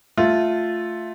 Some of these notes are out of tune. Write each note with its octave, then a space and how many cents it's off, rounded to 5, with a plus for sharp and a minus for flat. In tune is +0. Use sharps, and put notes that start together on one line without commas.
A3 +0 F4 +0